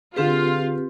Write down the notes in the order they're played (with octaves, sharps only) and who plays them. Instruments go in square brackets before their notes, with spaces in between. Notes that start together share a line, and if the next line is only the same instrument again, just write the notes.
[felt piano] D3 G#4 [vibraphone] C4 G4 B4 [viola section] F4